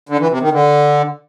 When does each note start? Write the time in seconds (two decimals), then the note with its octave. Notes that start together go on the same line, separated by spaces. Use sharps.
0.09 D3
0.20 E3
0.31 C3
0.42 D#3
0.53 D3